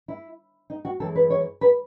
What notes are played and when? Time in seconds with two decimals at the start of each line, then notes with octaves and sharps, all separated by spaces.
0.08 E4
0.70 D#4
0.85 F#4
1.00 F#2 E3 G#3 A4
1.16 B4
1.30 C#5
1.61 B4